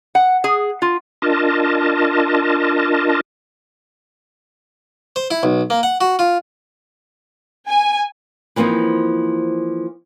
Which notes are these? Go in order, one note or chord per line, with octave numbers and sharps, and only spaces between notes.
F#5
G#4
F4
D4 F4 A#4 D#5 A5
C5
E4
B1
A#3
F#5
F#4
F4
G#5
E3 F3 A#3 C4 D#4